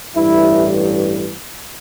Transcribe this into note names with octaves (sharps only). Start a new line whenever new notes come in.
A1 G2 E3 E4